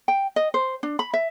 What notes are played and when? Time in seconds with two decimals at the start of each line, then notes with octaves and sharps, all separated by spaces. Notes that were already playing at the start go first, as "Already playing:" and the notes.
0.08 G5
0.36 D#5
0.54 C5
0.83 D4
0.99 B5
1.14 E5